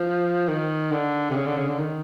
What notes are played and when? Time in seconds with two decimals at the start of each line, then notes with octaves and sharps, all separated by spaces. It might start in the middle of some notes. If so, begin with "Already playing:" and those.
Already playing: F3
0.49 D#3
0.91 D3
1.30 C3
1.36 C#3
1.46 D3
1.57 C#3
1.68 D3
1.79 D#3